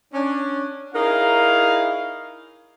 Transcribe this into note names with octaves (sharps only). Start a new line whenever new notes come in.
C#4 D4
D#4 E4 G#4 A#4 C#5 F5